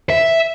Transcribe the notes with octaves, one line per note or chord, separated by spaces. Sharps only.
E5